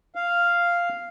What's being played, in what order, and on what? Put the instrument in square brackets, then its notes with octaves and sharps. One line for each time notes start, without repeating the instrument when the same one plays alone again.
[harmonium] F5